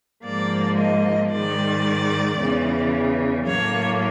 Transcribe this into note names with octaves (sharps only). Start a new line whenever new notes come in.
G#2 F3 A#3 D5
D#5
G#2 D#3 G#3 D5
E2 C#3 E3
A2 F#3 A#3 C#5